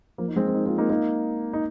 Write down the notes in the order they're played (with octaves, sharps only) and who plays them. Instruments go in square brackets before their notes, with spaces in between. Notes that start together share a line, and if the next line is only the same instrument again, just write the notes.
[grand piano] F3 A#3
D#4
G#3 C4
C4
A#3 D#4
C4 F4
A#3 D#4
A#3 D#4
D#4